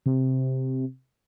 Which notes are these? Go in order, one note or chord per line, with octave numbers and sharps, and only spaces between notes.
C3